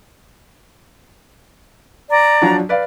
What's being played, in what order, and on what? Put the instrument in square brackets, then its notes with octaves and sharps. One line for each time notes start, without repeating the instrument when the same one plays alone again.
[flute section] D5 A#5
[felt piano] F3 F#3 D4
B4 D5 F5